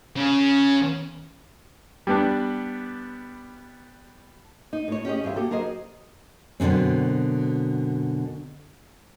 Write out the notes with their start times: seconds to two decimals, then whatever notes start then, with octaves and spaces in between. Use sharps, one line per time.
0.17 C#3 C#4
2.07 G3 B3 D4
4.73 D#4
4.88 A2 C#5
5.05 C#4 G4 G#4 D#5
5.24 G2 E3 F4 E5
5.36 A#3 F#4 G4 A4
5.51 F#3 G#4 A#4 C5 D#5
6.60 F#2 B2 D3 D#3 C4